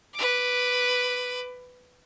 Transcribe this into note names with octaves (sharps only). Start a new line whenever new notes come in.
B4 D6